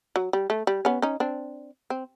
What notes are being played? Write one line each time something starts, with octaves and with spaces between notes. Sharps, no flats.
F#3
G3
A3
G3
B3 C#4
C#4 D#4
C4 D4
C4